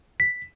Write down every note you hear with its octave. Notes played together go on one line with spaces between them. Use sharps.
B6